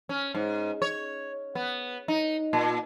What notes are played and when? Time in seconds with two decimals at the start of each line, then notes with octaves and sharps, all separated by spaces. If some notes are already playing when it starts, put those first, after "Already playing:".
0.09 C#4
0.34 G#2
0.82 C#5
1.55 B3
2.08 D#4
2.53 A#2